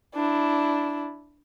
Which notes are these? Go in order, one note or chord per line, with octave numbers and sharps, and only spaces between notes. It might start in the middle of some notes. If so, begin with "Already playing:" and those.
D4 E4